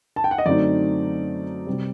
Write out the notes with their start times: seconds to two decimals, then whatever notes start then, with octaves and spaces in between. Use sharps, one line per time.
0.16 A5
0.24 G5
0.31 F#5
0.38 D#5
0.46 F#2 D3 A3 C4 D#4 D5
1.67 C3 G3